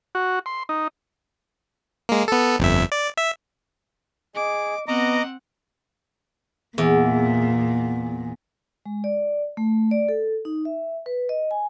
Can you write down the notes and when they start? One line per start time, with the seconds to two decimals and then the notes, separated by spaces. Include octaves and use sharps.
0.15 F#4
0.46 C6
0.69 D#4
2.09 G#3 A#3
2.28 B3 A4
2.59 G1 F2 E5
2.92 D5
3.17 E5
4.35 G#4 D#5 D6
4.88 B3 C4 D#5 F#5 A#5 D6
6.78 E2 A#2
8.86 G#3
9.04 D5
9.57 A3
9.91 D5
10.09 A4
10.45 D#4
10.65 E5
11.06 B4
11.29 D#5
11.51 G#5